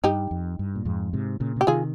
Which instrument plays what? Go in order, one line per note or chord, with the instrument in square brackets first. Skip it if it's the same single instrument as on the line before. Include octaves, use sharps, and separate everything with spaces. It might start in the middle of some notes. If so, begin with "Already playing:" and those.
[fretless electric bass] G2 [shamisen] D#4 G4
[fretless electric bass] F2
G2
A#2
F2 G#2
G#2 C3
A#2 C#3
[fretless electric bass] C#3 [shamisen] G4
[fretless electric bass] C3 D#3 [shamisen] F4 G#4